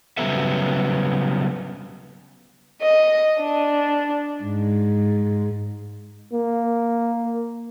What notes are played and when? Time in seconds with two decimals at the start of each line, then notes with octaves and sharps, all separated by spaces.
0.17 C#3 F#3 G3 B3 A4 E5
2.82 D#5
3.39 D4
4.42 G#2
6.33 A#3